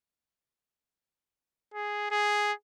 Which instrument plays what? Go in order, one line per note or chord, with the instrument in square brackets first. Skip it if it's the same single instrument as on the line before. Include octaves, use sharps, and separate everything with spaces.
[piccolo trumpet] G#4
G#4